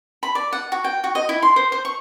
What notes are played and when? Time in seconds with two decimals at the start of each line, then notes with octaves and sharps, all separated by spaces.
0.23 B5
0.35 D5
0.53 F#5
0.72 F#4
0.84 G5
1.04 F#4
1.15 D#5
1.29 E4
1.42 C6
1.56 C5
1.72 C5
1.85 C#6